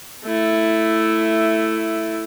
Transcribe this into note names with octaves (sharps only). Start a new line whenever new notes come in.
A3 E4